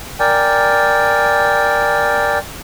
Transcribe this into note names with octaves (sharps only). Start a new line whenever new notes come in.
A#4 D5 G5 G#5